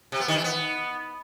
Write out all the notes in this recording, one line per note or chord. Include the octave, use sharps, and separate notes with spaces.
C3
B3
D#3
E3
B3